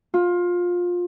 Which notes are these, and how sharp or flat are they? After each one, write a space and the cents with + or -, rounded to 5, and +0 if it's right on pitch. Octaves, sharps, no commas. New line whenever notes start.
F4 +20